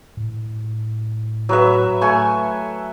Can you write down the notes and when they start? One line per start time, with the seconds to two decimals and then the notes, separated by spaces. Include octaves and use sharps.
0.17 A2
1.49 F#3 B4 E5
2.01 A3 G#5 C#6